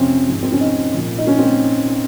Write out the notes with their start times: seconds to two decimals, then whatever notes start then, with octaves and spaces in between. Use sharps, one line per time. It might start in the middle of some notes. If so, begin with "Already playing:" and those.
Already playing: F2 C3 F3 C4 C#4
0.28 G#2 F3
0.43 C4
0.52 C#4
0.61 D#4
0.94 A#2 F3
1.18 D#4
1.27 C#4
1.38 C4